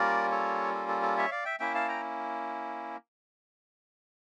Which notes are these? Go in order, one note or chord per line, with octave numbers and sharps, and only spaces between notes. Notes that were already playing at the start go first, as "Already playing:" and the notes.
Already playing: G3 A#3 C#4 F4 A#4 D5
A4 C#5
A4
A4
A4
C#5 E5
D5 F5
E5 G5
A#3 C#4 E4 E5 G5
F5 A5
G5 A#5